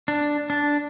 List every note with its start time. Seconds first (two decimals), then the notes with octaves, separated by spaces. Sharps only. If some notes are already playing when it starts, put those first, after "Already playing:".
0.08 D4
0.50 D4